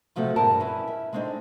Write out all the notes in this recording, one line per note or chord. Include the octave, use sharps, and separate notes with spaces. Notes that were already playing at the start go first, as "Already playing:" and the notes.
C3 F3 F#3 A3 C4
G2 B2 G#4 A#4 A5
C#4 E4 B4
E5
G#3 A3 C4 D4 D#4